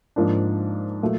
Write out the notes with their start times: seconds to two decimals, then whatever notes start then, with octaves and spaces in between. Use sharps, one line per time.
0.16 G#2 F3 A#3 D4
1.03 A#2 F#3 A3